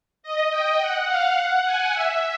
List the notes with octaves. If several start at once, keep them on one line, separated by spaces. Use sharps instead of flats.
D#5
G5
F#5
F5
F#5
G#5
E5